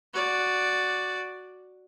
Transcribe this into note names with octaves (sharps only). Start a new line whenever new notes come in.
F#4 D5